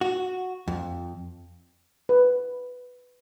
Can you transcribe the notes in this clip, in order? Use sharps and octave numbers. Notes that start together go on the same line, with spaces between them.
F#4
F2
B4